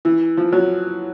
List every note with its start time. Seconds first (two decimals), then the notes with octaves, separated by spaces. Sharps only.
0.05 E3
0.37 F3
0.53 F#3